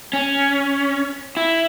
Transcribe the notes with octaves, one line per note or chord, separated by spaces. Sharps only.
C#4
E4